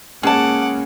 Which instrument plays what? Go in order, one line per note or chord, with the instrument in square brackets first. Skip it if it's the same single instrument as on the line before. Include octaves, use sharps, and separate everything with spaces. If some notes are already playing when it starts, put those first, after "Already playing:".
[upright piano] C#3 G#3 [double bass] A#3 C#4 [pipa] G#4 A5 [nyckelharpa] F#5 D6